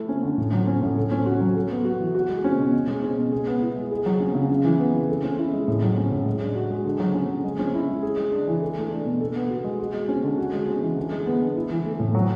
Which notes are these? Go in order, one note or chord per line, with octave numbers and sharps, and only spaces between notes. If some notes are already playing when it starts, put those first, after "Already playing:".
Already playing: A3 E4
C#4
D3
A2
F#3
C#4
A2
A4
C#4
F#4
F#3
A4
B3
F#4
E3
F#4
G#3
C#4
B2
B2
G#3
C#4
B2
G#4
B3
E4
G#3
G#4
F#3
C#4
C#3
C#3
E3
B3
C#3
A4
C#4
E4
G#3
A2
F#3
C#4
A2
G#3
D4
F#4
G#3
D3
F#3
C#4
D3
G#3
C#4
E4
G#3
G#4
G#3
D4
E3
A4
A3
D4
B2
A4
B3
F#4
G#3
F#4
G#3
C#4
D3
F#4
G#3
C#4
E3
D3
G#3
B3
D3
E4
E3
A3
A2
F#3